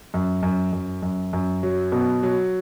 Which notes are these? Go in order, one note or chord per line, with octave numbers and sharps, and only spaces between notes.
F#2
F#2
F#2
F#2
F#2
F#3
B2
F#3